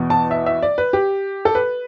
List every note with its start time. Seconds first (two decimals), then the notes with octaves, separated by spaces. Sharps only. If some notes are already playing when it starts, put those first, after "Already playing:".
Already playing: E2 B2 B3
0.10 A5
0.31 E5
0.46 E5
0.63 D5
0.78 B4
0.93 G4
1.45 A4
1.55 B4